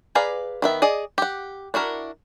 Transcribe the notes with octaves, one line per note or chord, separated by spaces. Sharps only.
G#4 B4 D5 F5 A#5
D#3 B3 E5
G#4 D5 D#5
G4 F#5
D4 E4 F#4 A#4